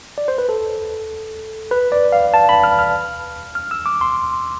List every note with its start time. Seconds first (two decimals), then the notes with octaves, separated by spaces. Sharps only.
0.18 D5
0.28 C5
0.38 B4
0.49 A4
1.71 B4
1.92 D5
2.12 F5
2.34 A5
2.49 B5
2.64 F6
2.79 F6
3.55 F6
3.71 E6
3.86 D6
4.01 C6